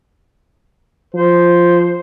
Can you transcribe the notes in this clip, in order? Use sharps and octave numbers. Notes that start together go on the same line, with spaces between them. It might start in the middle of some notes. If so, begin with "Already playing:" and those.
F3 C5